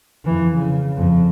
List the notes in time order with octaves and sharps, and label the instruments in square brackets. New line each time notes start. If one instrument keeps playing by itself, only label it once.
[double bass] F2 E3
C#3
F2